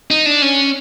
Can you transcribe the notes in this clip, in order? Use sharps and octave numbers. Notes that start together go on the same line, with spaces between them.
D#4
D4
C#4